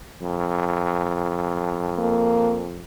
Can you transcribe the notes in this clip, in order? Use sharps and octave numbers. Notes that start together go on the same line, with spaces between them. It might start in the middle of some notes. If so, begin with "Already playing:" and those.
F2
A#3